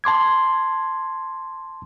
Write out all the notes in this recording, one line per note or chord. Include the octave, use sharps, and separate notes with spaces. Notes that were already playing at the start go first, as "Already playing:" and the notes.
A5 C6 D6 G#6